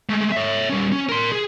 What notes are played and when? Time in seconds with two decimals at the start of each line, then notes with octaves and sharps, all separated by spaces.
0.09 G#3 A3
0.32 C#5 E5
0.70 G3 C#4
0.92 C#4
1.09 A#4 C6
1.32 G#4